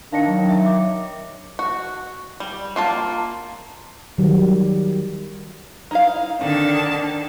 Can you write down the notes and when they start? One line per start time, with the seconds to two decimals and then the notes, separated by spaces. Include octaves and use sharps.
0.12 D#3 D4 F5 A#6 C#7
0.27 F#3
0.49 E5
0.65 E5 D6
1.59 F#4
2.40 G3
2.76 A#3 F4 A5
4.18 D#3 F#3 G3
5.91 D#4 E4 F5
6.41 D3 D#3 C4 A5